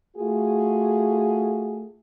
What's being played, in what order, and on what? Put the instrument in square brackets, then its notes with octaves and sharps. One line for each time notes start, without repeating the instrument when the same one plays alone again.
[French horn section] A3 F4 F#4 G#4